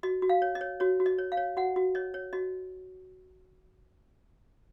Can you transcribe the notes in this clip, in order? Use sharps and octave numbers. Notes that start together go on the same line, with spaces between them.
F#4 D#5
F#4
F5
C#5
D#5
C#5
F#4 C#5
F#4
D#5
C#5
F5
C#5
F#4 F#5
F#4
C#5 D#5
C#5
F#4 D#5